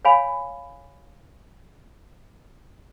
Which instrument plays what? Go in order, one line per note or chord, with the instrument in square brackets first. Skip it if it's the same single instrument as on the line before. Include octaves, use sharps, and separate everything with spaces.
[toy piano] C#5 F5 G#5 B5